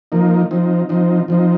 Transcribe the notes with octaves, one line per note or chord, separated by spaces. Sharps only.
F3 A#3 D#4
F3 C4 D#4
F3 C4 D#4
F3 C4 D#4